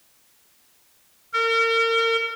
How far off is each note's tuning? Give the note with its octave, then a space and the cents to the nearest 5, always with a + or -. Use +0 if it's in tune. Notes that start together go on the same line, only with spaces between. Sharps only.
A#4 -35